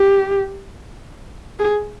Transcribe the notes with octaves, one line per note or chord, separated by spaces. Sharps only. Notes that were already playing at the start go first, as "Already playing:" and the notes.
Already playing: G4
G#4